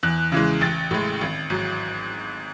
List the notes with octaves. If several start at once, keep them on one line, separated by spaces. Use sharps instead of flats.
E2 F#6
C#3 E3 G#3
A1 A6
A2 G#3
G#1
G#2 F#3